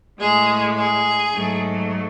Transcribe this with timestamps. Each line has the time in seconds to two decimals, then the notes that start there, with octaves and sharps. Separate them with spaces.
0.20 A2 G#3 G#4
0.76 G#4
1.33 G#2 F#3 A3